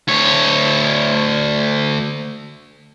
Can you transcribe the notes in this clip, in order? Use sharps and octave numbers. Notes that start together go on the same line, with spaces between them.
D2 C#5